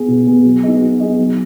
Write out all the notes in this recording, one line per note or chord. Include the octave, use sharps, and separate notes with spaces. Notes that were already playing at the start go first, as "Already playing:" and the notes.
Already playing: B3 G#4
B2
B3 G#4
F#3
B3 D#4 G#4 D#5
F#3
B3 D#4 G#4 D#5
F#3